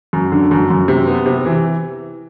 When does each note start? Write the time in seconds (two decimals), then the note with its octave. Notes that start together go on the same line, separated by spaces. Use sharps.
0.13 F#2
0.32 D3
0.51 F#2
0.70 F#2
0.88 C3
1.08 B3
1.26 C3
1.45 E3